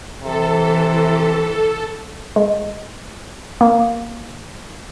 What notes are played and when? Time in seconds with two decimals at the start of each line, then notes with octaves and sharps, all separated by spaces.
0.23 C3 E3 A4
2.36 G#3
3.61 A#3